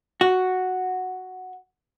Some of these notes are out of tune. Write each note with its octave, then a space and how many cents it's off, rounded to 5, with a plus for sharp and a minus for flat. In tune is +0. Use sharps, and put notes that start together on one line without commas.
F#4 +0